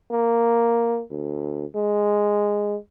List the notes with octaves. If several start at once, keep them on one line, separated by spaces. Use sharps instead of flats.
A#3
D2
G#3